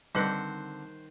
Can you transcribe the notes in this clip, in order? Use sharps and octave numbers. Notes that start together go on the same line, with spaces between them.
D3 D#3 G3 C4 B4 C5 F#5